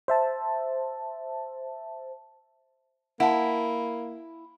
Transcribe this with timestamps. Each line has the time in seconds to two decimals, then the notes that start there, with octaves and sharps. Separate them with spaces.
0.08 C5 E5 A5
3.20 A#3 E4 F#5 A5